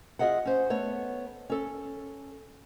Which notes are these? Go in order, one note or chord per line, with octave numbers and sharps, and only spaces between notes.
F4 G#4 D#5 E5 F#5
C#4 C5
A3 B3 C#5
C#4 A4